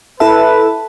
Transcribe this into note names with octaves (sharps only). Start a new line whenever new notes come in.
E4 A4 B4 E5 A5